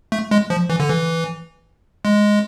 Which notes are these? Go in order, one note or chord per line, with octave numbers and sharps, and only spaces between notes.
A3
G#3
F3
E3
D3
E3
G#3